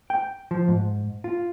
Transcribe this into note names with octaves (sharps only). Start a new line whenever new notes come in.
G5
F3
G#2
F4